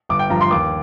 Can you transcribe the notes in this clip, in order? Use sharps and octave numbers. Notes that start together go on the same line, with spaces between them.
G1 D6
G5
G2 F3 A#5
C6
D#2 D6